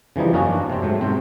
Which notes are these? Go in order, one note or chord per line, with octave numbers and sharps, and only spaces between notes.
C#3 E3 F3 G3 D#4
F#2 A#3 C#4 D#4 F#4 A#5
D4
C3 C4
G#2 F#3 A3
G#2 C3 C4